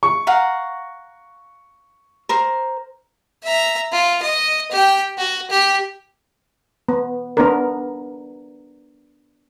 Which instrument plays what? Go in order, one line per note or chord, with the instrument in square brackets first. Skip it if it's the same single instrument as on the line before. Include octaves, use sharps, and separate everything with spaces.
[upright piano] C#6
[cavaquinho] F5 F#5 A#5
A#4 C5
[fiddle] E5 A#5
F4
D#5
G4 G5
F#4
G4
[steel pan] B3
B3 D4 A#4